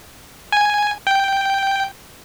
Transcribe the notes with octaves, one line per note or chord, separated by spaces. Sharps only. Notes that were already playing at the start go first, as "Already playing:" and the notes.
G#5
G5